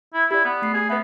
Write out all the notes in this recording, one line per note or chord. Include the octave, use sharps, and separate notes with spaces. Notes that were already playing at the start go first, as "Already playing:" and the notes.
E4
E4 G4 D5
B3
A3 C7
G#4
B3 B4 E5